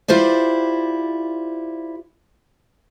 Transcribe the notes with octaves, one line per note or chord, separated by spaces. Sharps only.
E4 F4 G4 C5 D5